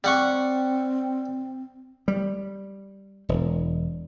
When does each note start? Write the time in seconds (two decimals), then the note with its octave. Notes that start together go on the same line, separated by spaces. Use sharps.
0.04 G3 C4 F#5 C#6
2.08 G3
3.29 E1